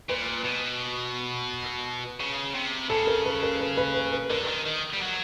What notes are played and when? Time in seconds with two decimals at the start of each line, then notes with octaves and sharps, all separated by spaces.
0.09 A#2 B4
0.44 B2
2.20 C#3
2.54 C3
2.89 C#3 A4
3.07 A#4
3.25 B4
3.43 A#4
3.60 B4
3.77 B4
3.95 B4
4.13 B4
4.30 D3 A#4
4.47 D#3
4.66 D#3
4.93 G3
5.00 F#3